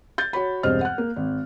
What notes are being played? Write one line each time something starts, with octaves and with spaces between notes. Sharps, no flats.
G6 A6
F#4 C#5 B5
E1 G2 C4 C5 D#5 F6
F#5 F#6
A#3
G#1